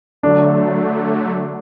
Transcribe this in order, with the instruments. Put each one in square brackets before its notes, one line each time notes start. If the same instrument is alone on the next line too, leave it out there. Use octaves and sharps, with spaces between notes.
[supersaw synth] D3 F#3 A3 [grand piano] D4